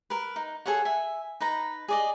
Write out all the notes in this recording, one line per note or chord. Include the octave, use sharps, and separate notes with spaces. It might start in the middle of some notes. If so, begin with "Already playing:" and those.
A#4 B4
D#4
G#4 A4 C#5 F#5
E5 G#5
D#4 B4 A#5
G#4 D5 D#5